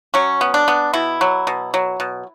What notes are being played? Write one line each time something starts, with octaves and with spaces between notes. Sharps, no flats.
F#3 C#4
B3
D4
B3
B2 E4
F#3
B2
F#3
B2